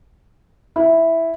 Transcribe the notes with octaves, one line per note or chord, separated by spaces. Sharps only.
E4